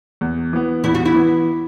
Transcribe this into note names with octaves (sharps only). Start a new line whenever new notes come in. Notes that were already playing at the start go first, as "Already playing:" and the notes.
E2
E3 B3
E2 E4
F#4
E4
E3 B3